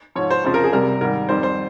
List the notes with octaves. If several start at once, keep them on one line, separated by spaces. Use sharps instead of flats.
G#2 F3 C#5
C5
F2 C#3 F3 C5
A#4
G#4
C2 C3 G3 A#4
G#2 D#3 G3 A#4
F2 D#3 G3 C5
C5